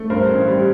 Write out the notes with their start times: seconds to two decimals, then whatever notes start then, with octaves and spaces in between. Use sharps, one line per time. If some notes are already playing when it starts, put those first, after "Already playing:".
Already playing: A3
0.10 G2 A#4 C5
0.29 A1
0.48 G3